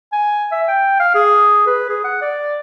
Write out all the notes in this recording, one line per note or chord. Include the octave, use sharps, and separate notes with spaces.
G#5
E5
G5
F5
G#4
B4
G#4
F#5
D5